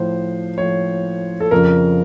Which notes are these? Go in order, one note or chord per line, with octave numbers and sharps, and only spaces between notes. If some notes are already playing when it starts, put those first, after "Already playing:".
Already playing: A2 F3 C5
A2 F3 C#5
A4
F2 C#3 F3 A#4